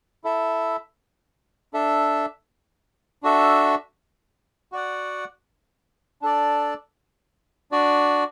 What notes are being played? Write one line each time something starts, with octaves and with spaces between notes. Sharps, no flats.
E4 A4 E5
D4 A4 E5
D4 F#4 A4 E5
F#4 D5 F#5
D4 A4 D5
D4 F#4 D5